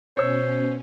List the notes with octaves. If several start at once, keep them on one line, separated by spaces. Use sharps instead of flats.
B2 C#4 C5 C#5 E6